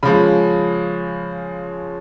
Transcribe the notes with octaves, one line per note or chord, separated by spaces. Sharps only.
C#3 F3 G#3 B5